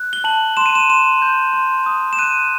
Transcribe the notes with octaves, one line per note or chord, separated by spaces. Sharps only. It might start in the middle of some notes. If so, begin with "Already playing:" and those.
Already playing: F#6
G7
A5 F#7
C6 E7
D#7
E7
C6 E7
G6
C6
D#6
E7
F#6 D#7